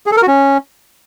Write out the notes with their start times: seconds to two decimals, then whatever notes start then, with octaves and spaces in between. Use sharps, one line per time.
0.06 G#4
0.12 A4
0.17 A#4
0.22 F#4
0.28 C#4